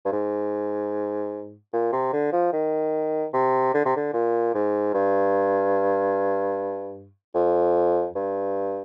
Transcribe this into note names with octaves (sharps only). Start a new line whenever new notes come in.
G2
G#2
A#2
C3
D3
F3
D#3
C3
D3
C3
D3
A#2
G#2
G2
F2
G2